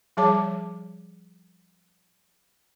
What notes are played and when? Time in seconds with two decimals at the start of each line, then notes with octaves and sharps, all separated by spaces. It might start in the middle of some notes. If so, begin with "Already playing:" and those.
0.17 F3 G3 G#4 C#5 A5 D6